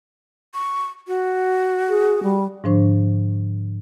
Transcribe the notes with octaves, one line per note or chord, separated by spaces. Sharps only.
C#6
F#4
G#4
G3
G#2 D3 F3 D4 C5 C#6